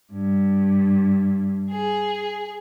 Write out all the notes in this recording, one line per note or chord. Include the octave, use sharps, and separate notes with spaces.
G2
G#4